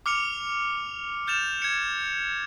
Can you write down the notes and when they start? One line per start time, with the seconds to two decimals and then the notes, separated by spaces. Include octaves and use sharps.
0.06 D6 F6 C#7 F7
1.27 D6 F6 G6 A6 E7 F7
1.62 G#6 C#7